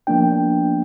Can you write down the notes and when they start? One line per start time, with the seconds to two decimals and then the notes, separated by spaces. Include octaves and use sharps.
0.07 F3 A#3 B3 D4 G5